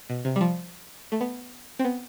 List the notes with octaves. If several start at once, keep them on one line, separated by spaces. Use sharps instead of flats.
B2
C3
G3
F3
A3
B3
C4
B3